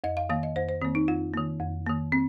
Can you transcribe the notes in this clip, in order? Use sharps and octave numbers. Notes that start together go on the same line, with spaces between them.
F2 D#5
F5
D#3 A#3 F5
D#5
F2 C5
C5
D#3 A#3 C4
D#4
F2 F4
D#3 A#3
F2
D#3 A#3
C4